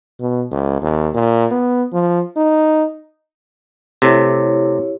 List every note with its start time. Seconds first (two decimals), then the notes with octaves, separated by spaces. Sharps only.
0.20 B2
0.51 C#2
0.82 D#2
1.14 A#2
1.51 B3
1.93 F3
2.37 D#4
4.02 C3 A3 E4 G4 C#5